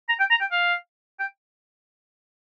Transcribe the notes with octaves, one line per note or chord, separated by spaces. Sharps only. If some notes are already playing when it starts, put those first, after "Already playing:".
A#5
G5
A#5
G5
F5
G5